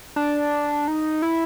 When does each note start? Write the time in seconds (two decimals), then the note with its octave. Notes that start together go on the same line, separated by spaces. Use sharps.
0.16 D4
0.88 D#4
1.22 E4